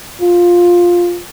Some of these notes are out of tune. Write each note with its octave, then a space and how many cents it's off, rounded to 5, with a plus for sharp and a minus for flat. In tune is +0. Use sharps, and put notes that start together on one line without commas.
F4 +5